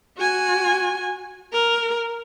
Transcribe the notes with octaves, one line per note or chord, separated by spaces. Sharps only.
F#4 G#5
A#4